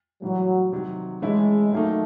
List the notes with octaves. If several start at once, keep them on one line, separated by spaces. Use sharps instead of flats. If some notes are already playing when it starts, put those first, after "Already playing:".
A2 E3 F#3 G3
C3 D#3 F#3
E3 G#3 A3 C#4 E4
D#3 F#3 A3 A#3 D#4